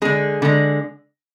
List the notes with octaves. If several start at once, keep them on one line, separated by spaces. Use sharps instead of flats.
D3 G#3 G#4
D3 G#3